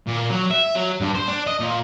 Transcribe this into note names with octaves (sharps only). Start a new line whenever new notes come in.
A#2
F#3
E5
F#3
G2
C5
D4
D#5
A#2